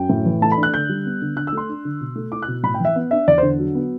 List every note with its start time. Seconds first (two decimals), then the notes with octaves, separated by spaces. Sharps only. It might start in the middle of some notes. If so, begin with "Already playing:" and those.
Already playing: F#2 G5
0.09 A2
0.26 E3
0.42 A3 A5
0.52 B5
0.58 D4
0.63 F#6
0.74 D3 G6
0.89 G3
1.06 B3
1.22 D3
1.36 D3 F#6
1.47 E6
1.53 A3 C6
1.69 D4
1.85 D3
2.01 B2
2.16 A3
2.32 E4 D6
2.42 F#6
2.48 B2
2.63 A2 B5
2.74 G5
2.80 E3 E5
2.96 B3
3.11 D4 E5
3.27 E2 D5
3.38 C5
3.43 D3
3.59 F#3
3.75 B3